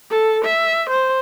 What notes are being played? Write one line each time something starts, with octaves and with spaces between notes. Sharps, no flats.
A4
E5
C5